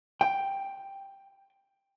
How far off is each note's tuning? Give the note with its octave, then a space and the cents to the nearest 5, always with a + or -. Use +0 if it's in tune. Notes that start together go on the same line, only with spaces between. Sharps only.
G5 +5